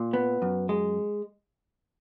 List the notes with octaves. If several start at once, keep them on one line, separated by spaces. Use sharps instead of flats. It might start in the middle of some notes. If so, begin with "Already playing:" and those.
Already playing: A#2
B3
F#2
G#3